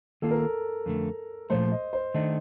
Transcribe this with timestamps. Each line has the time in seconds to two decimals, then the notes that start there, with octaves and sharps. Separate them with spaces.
0.22 D#3 A#3 F4 A4
0.31 A#4
0.39 A4
0.86 F2 D3 A3
1.50 A#2 F3 A3 C5
1.72 D#5
1.93 C5
2.14 D#3 A3 D4 D#5